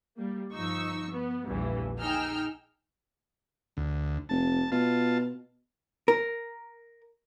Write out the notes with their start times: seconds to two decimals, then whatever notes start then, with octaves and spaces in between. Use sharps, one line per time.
0.17 G3 A#3
0.53 G1 F3 D#4 C#6 E6
1.11 B3
1.47 A#1 E2 G2 A#2 D3 E3
1.99 D#4 G#4 G5 E6 F6
3.77 D2
4.29 F1 A5
4.72 B2 F4 A5
6.08 A#4